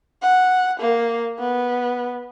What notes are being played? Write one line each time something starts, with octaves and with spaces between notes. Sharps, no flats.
F#5
A#3
B3